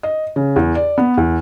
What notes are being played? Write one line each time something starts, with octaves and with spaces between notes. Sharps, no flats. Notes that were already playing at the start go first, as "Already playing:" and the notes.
D#5
C#3
E2
D5
B3
E2